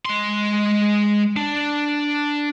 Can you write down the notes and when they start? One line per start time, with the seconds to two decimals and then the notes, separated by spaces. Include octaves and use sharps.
0.05 G#3 C6
1.36 D4